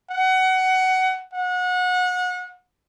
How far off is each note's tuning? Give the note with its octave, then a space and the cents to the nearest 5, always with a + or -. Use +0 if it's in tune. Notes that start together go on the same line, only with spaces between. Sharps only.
F#5 +20
F#5 -30